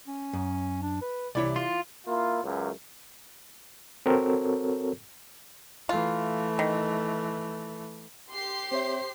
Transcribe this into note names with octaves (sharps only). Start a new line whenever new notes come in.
C#4
F#2
D4
B4
C2 C3 E3 E4 C#5 D5
F4 C6
A#3 E4 F4
C#2 F#2
C4 F#4 A4 A#4 C#5
E3 A3 F4
D#3
G4 C6 C7
C4 C5 C#5 E5